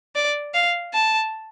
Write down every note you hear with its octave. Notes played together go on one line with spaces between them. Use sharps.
D5
F5
A5